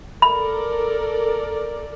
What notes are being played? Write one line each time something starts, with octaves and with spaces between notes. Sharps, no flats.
A4 A#4 D5 B5